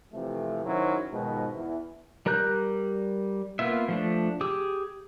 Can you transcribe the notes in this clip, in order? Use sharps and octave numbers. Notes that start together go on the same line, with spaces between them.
C3 E3 F3 A3
F#2 D#3 F#3 C#4 E4 C5
G#2 B2 D#3 F3 G#3
E2 E3
G3 A#4 A#5 F#6 G6
A#3 B3 F4 E5
F3 A3 D4
G4 G#4 D6 E6